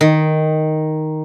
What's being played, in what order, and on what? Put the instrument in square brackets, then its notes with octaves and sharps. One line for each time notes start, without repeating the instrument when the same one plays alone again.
[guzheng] D#3